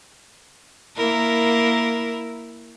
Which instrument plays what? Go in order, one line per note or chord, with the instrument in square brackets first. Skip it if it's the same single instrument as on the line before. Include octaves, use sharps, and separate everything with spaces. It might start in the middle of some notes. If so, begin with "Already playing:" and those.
[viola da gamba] A#3 E4 A#4